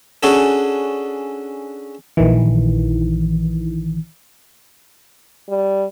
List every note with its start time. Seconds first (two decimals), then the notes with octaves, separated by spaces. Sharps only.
0.23 C#4 D4 F#4 G#4 A4
2.17 A#1 D#3 E3
5.49 G3